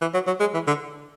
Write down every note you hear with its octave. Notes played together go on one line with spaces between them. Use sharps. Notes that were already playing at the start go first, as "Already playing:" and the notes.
E3
F#3
F#3
G#3
E3
D3